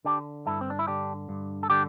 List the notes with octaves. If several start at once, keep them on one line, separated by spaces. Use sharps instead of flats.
D3 D4 G4
G2 E4 A4
C4
D4
E4
D3 D4 G4
G2
A4
D3 D4 G4